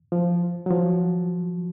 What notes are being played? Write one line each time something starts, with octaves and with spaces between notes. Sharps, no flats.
F3
F#3
F3